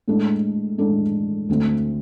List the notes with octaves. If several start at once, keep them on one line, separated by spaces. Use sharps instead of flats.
A2 G#3 D4 A4
A2 G#3 D4 A4
D2 D3 A3 C4